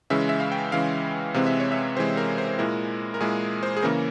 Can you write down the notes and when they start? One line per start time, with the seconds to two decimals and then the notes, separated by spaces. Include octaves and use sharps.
0.10 C#3 E3 G#3 C#4 E5
0.29 E5
0.40 F5
0.52 G5
0.72 C#3 E3 G#3 C#4 F5
1.34 C3 E3 G#3 C4 F5
1.46 E5
1.60 C#5
1.72 E5
1.96 C3 E3 G#3 C4 C5
2.17 A#4
2.38 C5
2.49 C5
2.59 A#2 G#3 E4 A#4
3.14 A#4
3.20 A#2 G#3 E4 G#4
3.63 C5
3.77 G#4
3.82 C#3 E3 A#3 C#4 A#4